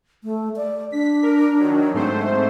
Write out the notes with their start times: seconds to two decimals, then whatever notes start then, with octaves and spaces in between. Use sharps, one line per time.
0.24 A3
0.56 D5
0.92 D4 B6
1.23 A#4
1.60 D#3 F#3
1.94 G#2 A3 C4 C5